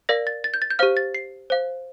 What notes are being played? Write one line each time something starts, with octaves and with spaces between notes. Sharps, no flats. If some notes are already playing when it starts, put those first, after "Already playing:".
A#4 D5 F5 A#6
A6
A6
G6
A6
G6
G4 C5 F5 F6
A6
C7
C5 F5